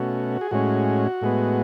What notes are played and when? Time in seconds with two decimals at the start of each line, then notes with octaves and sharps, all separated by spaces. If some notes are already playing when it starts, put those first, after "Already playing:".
Already playing: B2 A3 C#4 F#4
0.41 G#4
0.51 A2 G#3 C#4 F#4
1.22 A2 G#3 B3